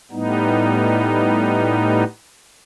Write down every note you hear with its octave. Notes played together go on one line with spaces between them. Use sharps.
A2 G3 B3 D#4